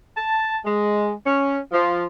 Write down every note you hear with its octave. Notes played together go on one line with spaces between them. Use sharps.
A5
G#3
C#4
F3